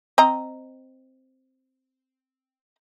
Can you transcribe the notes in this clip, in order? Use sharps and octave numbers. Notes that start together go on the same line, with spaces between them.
C4 D#5 A#5